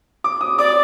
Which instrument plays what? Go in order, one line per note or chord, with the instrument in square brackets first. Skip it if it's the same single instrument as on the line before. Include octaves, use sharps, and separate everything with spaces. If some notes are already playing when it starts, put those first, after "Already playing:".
[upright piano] D6
D#6
[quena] D5 [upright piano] D6